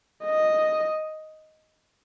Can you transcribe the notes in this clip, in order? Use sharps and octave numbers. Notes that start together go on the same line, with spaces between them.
D#5